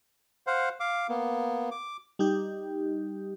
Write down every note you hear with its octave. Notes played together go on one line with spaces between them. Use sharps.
C5 F5 F#5
F5 D6
A#3 B3
D6
G3 D#4 G4